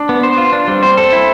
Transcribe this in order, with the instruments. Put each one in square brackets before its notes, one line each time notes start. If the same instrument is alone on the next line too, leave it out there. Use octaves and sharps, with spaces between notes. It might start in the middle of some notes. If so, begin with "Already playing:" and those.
Already playing: [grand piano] D4
[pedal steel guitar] B3
C5
F4
D4
[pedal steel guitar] G3 [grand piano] C4
[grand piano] C4 [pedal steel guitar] C5
[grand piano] C4 [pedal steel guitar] A4
[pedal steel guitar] E4